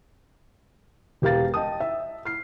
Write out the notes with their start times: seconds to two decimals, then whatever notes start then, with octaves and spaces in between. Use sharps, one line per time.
1.22 E1 G4 A#4 F5 A6
1.54 D#5 G5 A5 D#6
1.80 E5
2.25 F6 C7